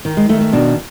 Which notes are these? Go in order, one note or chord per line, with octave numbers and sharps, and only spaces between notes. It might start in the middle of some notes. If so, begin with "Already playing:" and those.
D#3
G#3
D#3 A3
A3
B2 D4